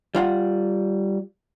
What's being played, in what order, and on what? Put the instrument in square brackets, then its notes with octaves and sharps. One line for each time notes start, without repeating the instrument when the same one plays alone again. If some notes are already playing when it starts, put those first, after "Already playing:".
[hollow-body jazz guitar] G3 F4 F#5